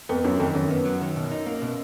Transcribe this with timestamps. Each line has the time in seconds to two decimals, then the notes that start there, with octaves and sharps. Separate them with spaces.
0.09 F2 B3
0.24 F#2 F#3
0.40 F2 D#3
0.55 F#2 D#3
0.70 B3
0.85 F#3
1.01 D#3
1.16 B2
1.32 D#4
1.46 A#3
1.62 B2